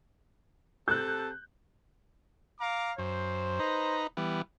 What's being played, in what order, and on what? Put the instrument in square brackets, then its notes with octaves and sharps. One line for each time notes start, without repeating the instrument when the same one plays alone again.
[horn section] C3 A4 [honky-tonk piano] F#6 G6
[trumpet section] F5 A#5 D6
[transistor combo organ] F#2 [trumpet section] C5
[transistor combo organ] D#4 B4 A#5
E3 G3 B3